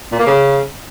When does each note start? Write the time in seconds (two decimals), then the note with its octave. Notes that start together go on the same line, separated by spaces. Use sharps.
0.12 A#2
0.19 A#3
0.26 C#3